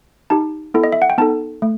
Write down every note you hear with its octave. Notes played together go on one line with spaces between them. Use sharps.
D#4 G4 A5
B3 E4 A4
D#5
E5
F#5
G5
B3 D#4 A4 A5
A3